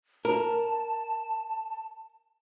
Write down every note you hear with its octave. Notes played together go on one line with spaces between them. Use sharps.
A#4 A5